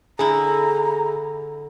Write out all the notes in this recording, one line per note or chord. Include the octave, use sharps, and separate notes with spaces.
D3 E4 G#4 A#5